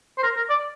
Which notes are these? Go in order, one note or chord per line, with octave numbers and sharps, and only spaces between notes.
C5
A#4
A#4
D5